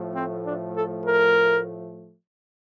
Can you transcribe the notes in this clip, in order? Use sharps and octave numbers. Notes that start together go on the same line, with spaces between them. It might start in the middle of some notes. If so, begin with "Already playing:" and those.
Already playing: A2 F3 A3
C4
D4
A4
A#4